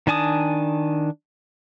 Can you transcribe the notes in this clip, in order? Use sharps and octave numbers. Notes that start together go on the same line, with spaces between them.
D#3 D4 G#5 A5 D#6